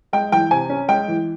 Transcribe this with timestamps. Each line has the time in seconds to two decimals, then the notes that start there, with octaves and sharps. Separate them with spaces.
0.13 G#3 G5
0.32 E3 G5
0.51 C3 G#5
0.69 C#4
0.88 G#3 G5
1.08 E3